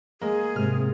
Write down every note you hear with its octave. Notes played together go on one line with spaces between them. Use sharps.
G#3 A#3 G#4
G#2 C3 F6